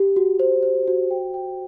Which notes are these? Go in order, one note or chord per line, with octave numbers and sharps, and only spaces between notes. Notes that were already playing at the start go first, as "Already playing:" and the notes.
Already playing: G4
F#4
C5
C5
F#4
G5
G5